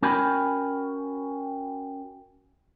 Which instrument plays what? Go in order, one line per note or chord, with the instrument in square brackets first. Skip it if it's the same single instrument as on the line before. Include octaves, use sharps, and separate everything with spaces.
[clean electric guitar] C#4 F#4 A#4 G5 G#5 B5